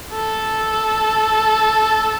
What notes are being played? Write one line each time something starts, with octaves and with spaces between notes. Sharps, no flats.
A4